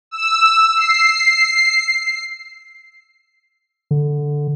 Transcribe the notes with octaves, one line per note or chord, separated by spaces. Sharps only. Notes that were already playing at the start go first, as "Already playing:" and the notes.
E6
C7
D3